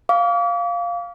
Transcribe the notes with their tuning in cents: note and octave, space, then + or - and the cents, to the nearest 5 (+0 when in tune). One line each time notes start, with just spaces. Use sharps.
F5 +0 D6 -40